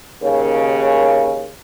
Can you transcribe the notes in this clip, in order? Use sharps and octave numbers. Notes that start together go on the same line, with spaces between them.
D#2 C#3